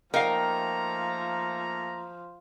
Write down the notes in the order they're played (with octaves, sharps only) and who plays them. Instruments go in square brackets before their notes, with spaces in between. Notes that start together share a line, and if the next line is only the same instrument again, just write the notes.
[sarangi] F3 [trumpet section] A3 A#3 A#5 [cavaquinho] D#4 G5 [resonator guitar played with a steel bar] A#4 F5